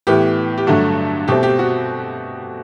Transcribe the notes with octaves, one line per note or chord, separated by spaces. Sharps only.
A2 E3 B3 G4
G4
G2 D3 F#3 A3 F#4
B2 A3 C4 G4
G4
F#4